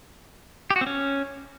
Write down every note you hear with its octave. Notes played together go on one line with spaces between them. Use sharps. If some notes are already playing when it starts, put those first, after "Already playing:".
G4
F#4
C4
C#4